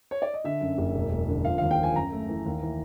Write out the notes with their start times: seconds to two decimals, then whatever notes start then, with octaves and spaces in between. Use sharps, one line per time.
0.11 C#5
0.22 D5
0.34 D#5
0.44 D3 E5
0.61 F#2
0.78 F#1
0.95 E1
1.12 E1
1.28 D3
1.45 F3 F5
1.58 D#2 F5
1.71 G5
1.79 F3 G#5
1.96 F#2 A#5
2.12 A3
2.29 E3
2.45 D#2
2.62 E3